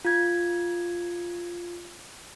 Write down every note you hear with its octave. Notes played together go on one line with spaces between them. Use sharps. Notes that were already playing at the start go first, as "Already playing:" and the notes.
F4 G#6